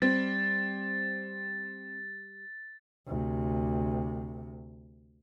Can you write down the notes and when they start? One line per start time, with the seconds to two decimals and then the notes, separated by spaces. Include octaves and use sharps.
0.02 G3 C4 A6
3.07 D2 C3